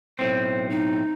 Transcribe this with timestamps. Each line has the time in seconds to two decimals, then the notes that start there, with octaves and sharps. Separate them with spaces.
0.19 B1 A2 C4 C5
0.69 D#4